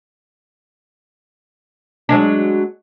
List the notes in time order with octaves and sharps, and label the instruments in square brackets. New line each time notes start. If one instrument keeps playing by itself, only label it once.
[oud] F#3 G#3 D4